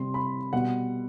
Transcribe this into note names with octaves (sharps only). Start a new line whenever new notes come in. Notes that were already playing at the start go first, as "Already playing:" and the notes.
Already playing: C3 G3 C6
B5
B2 G3 F#5